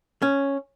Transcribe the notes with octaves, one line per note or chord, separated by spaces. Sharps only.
C#4